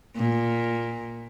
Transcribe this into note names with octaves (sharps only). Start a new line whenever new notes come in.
A#2